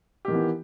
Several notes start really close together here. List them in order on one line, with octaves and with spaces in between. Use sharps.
G4 D#3 E3 B3